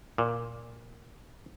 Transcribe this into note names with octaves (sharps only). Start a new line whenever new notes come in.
A#2